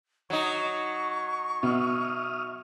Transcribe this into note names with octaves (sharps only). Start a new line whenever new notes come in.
F#3 D#4 C#6
B2 E5 D#6 F6